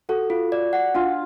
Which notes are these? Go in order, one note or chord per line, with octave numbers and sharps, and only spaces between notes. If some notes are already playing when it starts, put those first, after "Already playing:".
F#4 A4
F4
D5
F#5
D4 F4